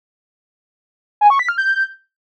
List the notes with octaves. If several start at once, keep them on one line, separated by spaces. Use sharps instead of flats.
G#5
C#6
B6
F6
G6